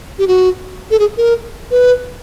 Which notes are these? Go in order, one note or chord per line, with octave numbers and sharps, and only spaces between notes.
G4
F#4
A4
G#4
A#4
B4